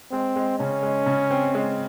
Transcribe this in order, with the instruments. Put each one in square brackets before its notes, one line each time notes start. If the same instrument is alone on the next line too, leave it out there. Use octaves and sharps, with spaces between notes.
[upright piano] G#3 [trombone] C4
[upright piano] G#3
[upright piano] C#3 [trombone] C#4
[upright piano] G#3
C#3
C4
G#3